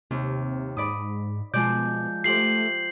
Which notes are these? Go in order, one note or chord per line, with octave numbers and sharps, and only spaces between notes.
D#2 C3
G#2 D5 B5 D#6
B2 F3 G#3 D5 G6
A3 F4 G4 C5 C7 F#7